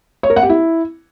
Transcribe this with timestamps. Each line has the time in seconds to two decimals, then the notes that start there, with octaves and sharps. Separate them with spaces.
0.23 C#5
0.30 A#4
0.36 F#5
0.43 G4
0.49 E4